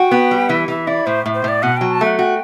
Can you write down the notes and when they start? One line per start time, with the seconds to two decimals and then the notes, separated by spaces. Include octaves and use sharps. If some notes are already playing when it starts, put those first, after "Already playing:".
Already playing: F#4 G5
0.11 B3
0.31 G3
0.49 E3 E5
0.68 E3 E5
0.87 E4 D5
1.06 A2 C5
1.26 A2
1.34 C5
1.44 A2 D5
1.63 B2 F#5
1.77 F#3 G5
1.91 A5
2.01 A3 F#5
2.19 F#4 G5